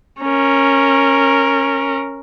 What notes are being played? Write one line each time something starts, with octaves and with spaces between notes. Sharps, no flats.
C#4 A#4